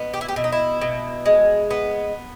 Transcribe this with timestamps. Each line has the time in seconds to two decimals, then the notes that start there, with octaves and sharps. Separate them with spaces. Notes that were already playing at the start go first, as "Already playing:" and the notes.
Already playing: B2 B3
0.14 G4
0.21 E4
0.28 G4
0.36 B2 E4
0.44 D#4
0.52 E4
0.81 B2
1.26 G#3
1.71 B3